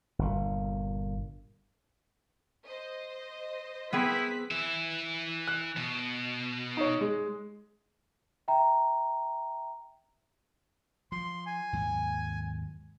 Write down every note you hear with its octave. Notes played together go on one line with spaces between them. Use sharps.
G1 A#2
C5 D#5
B3 C4 E4 G#4 B4 B6
E3 E5
F#6
B2
D#4 C#5
G#3
E5 G5 A#5
F3 C6
G#5
D#2 G#2 F#3